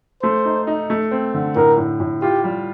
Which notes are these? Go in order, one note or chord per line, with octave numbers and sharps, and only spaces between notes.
A3 C5
D#4
D#4
A3
C4
D3
A2 A#4
A2
A2
F4 G4
G3